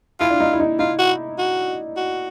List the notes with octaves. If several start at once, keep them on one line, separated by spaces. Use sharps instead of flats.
E4 F4
D4
D#4
E4
D#4
D#4 F4
F#4
F#4
F#4